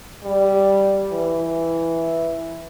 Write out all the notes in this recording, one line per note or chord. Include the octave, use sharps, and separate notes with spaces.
G3
E3